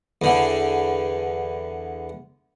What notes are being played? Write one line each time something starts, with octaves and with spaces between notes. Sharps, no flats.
E2 D3